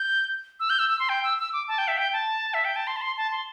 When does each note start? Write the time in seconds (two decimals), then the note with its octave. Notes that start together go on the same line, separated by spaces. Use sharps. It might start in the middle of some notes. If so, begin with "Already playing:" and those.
Already playing: G6
0.60 E6
0.70 G6
0.79 E6
0.90 E6
0.99 C6
1.09 G5
1.23 E6
1.39 E6
1.53 D6
1.68 A5
1.78 G5
1.88 E5
1.98 G5
2.13 A5
2.54 E5
2.65 G5
2.76 A5
2.87 C6
2.97 A5
3.02 C6
3.17 A5
3.31 C6